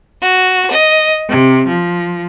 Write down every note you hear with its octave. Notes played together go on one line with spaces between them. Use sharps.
F#4
D#5
C3
F3